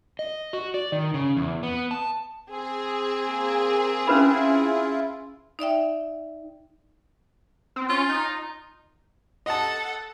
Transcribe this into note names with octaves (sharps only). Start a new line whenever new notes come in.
D#5
F#4
D5
D#3
C#3
E2
B3
A5
C4 G#4
A#3
C#4 E4 F4 B4 B5
D#4 D5 E5 G5
C4
C#4 F4
D#4
A4 D#5 F#5 A5